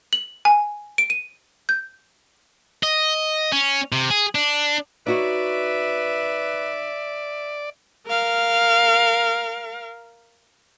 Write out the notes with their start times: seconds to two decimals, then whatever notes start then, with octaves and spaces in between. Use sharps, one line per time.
0.13 F#7
0.45 G#5
0.98 D7
1.10 D#7
1.69 G6
2.83 D#5
3.52 C#4
3.92 C3
4.11 G#4
4.35 D4
5.07 D#4 F#4 B4 C#5 D5 E5
8.07 A#4 F5